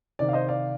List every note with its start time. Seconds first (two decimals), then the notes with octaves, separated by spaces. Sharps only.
0.19 C3 D#3 D5
0.29 F5
0.33 C5 D#5
0.48 D5 F5